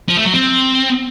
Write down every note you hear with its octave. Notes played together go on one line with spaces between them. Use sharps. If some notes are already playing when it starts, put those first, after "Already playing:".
F3
A3
F#3
C4